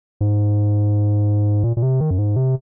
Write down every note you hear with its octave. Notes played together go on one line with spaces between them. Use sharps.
G#2
A#2
A#2
C3
D#3
F#2
G#2
C3